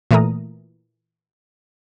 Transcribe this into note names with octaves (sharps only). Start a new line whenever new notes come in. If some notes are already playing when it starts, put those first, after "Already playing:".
A#2 E3 A3 A#4 A#5 D#6